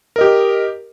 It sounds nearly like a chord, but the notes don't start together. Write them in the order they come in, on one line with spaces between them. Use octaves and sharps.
A#4 D#5 G4